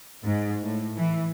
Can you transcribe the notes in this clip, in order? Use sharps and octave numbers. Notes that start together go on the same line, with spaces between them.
G#2
A2
E3